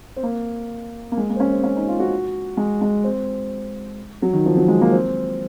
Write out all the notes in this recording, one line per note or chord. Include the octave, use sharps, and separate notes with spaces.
C4
A#3
A#3
G#3
A#3
C4
C#4
C4
C#4
D#4
F4
F#4
G#3
G#3
C4
F#3
D#3
F3
F#3
G#3
A#3
C4